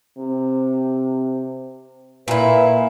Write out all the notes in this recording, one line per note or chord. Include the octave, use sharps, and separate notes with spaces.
C3
A#2 E4 B4